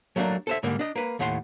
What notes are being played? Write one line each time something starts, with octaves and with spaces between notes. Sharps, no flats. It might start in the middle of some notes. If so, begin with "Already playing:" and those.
F#3 A3 A#3 C4 D4
A4 C5 E5
G#2 D3 G3 A#3
D4 D#5
A#3 B4
D#2 A2 A3 F#5 C6